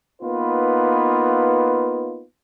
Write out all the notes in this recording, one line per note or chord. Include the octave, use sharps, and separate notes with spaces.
A#3 B3 D#4 F4 B4